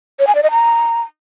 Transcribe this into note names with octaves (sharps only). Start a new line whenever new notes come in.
C#5
G#5
D5
D#5
A#5